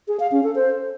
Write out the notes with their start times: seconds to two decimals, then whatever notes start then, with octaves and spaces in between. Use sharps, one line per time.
0.08 G#4
0.20 F5
0.32 C#4
0.44 A4
0.55 C5